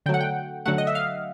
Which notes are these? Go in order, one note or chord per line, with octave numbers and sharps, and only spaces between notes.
D3 F#3 A3 F#5 G5
G5
D3 F#3 A3 F#5
D#5
E5
F5